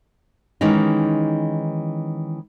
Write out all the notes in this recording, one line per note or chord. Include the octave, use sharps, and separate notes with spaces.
D#3 E3 G#3 C#4 D#4